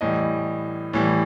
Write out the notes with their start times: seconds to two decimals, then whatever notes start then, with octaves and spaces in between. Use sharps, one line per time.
0.01 A2 E3 G3 D#5
0.94 A2 E3 G3